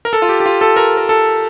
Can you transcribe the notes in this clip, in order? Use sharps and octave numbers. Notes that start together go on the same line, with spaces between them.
A#4
A4
F4
G4
G4
F4
A4
A#4
A#4
A4